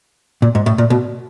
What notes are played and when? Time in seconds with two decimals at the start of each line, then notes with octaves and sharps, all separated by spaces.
0.42 A#2
0.55 G#2
0.66 A2
0.78 A#2
0.90 B2